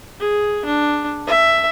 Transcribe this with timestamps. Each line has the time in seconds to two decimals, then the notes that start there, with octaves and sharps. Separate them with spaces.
0.20 G#4
0.65 D4
1.27 E5